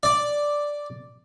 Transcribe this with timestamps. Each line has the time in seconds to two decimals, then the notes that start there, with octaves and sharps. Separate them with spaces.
0.03 D5